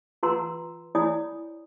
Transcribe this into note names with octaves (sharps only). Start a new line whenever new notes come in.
F4 B4 F#5 A#5 C6 E6
E4 C#5 D5 G#5 B5 D#6